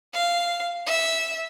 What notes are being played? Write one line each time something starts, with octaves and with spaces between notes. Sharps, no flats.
F5
E5